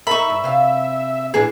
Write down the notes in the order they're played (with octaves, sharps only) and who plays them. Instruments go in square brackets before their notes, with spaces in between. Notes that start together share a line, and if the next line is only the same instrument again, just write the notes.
[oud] D#4 A#4 [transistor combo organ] E5 [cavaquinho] B5 C#6
[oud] G2
C3 F5
[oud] A2 E3 D4 [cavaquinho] G#4